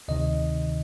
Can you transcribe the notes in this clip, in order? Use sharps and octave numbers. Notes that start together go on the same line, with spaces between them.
D2 C3 D#3 D#5